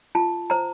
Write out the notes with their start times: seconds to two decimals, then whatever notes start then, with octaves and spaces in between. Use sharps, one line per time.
0.15 F4 A5
0.50 C5 A#5